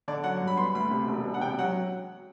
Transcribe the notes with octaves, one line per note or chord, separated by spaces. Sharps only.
D3 D5
F#3 F#5
G2
B5
B3 C6
D2 B5
C3
E1
E1
F#5
C3 G5
F#3 F#5